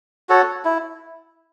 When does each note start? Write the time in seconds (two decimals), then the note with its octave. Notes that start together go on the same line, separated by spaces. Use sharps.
0.29 F#4 A4 C#5
0.65 E4